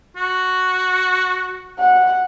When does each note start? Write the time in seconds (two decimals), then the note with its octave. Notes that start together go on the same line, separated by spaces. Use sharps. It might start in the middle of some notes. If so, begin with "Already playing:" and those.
0.16 F#4
1.79 F#5